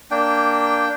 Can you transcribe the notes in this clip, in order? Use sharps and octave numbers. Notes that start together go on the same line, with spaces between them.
A#3 D4 G5